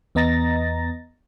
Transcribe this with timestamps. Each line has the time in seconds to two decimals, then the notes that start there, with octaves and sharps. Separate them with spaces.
0.15 E2 B3 D#5 A#5 A6 A#6